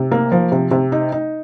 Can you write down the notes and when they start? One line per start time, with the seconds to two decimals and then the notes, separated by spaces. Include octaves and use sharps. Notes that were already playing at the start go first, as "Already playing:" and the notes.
Already playing: C3
0.11 A#3
0.32 F3
0.52 C3
0.71 C3
0.92 D#4
1.12 D#4